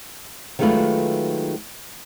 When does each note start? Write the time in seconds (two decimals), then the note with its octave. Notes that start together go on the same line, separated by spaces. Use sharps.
0.59 D#3 F#3 G#3 A3 F4 B4